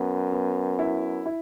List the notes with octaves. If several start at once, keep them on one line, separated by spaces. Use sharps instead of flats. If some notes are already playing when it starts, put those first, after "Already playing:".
Already playing: F#2 B3
B3
E4
E4